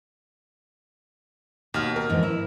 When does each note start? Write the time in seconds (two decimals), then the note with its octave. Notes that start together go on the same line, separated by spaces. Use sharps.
1.74 D#2 B2 F6
1.96 A#4
2.09 F2 G#2 E3
2.23 E4